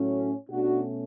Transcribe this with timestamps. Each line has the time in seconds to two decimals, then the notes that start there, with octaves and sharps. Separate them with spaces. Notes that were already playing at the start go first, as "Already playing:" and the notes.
Already playing: A2 F#3 A3 C#4
0.50 B2 A3 C#4 D4 F#4